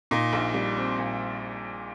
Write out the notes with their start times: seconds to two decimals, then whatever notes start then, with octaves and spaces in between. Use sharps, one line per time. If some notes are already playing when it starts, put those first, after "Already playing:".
0.11 A#2 D#4
0.33 A#1
0.54 G3
0.76 C4
0.98 A#2